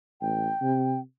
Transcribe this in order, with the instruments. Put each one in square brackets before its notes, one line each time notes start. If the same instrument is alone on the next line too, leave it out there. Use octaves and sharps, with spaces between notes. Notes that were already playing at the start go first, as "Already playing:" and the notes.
[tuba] A1 [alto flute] G5
[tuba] C3